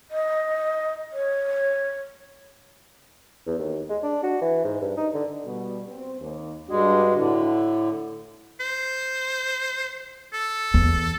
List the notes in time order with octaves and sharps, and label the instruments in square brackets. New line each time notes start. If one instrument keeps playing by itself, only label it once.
[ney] D#5
C#5
[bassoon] E2
D#2
G#3
D4
F#4
E3
G#2
G2
D#4
D3
[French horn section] B2 G3
C4
D#2
[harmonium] G2 G#3 [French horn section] D4 F#4
[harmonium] A2 D3
[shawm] C5
A4
[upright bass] E2